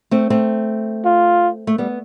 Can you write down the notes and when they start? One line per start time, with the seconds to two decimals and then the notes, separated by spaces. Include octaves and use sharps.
0.11 A3 C4
0.30 A3 C4
1.05 F4
1.67 A3
1.78 G3 B3